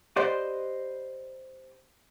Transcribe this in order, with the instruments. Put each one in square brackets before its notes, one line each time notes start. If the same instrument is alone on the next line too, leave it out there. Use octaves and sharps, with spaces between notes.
[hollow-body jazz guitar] G4 B4 C5 D5 D#5